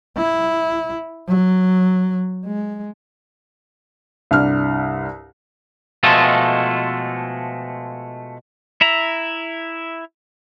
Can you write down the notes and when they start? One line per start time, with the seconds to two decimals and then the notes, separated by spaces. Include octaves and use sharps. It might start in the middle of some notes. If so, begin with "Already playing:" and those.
0.17 E4
1.28 F#3
2.46 G#3
4.31 C2 G2 D4 F6
6.03 B2 F3 G#3 A3 F4 A4
8.81 E4 E5 A#5